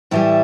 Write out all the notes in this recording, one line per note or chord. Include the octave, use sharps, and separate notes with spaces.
A2 E3 G3 E4